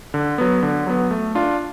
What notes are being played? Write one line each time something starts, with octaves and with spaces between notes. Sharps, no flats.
D3
F#3 B3
D3
F#3 B3
A3
D4 F4